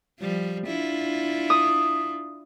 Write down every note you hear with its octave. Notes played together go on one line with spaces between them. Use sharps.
F3 G3
D4 E4 F4
D#6